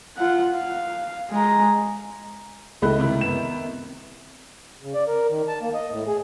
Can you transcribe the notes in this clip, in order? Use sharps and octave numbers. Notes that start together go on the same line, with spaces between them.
F4 F#5
F5
G#3 A#5
C#2 A3 E4 D#5 B5 F#6
C3 D#3 E4
B3 B4 E7
C#3
D5
A#4
D#3
A5
A#3
D#5
A2
G#4